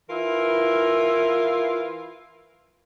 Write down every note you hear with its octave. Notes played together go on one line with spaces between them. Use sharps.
E3 E4 F4 A#4